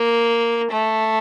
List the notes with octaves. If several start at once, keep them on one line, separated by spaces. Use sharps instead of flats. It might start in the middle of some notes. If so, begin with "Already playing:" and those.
Already playing: A#3
A3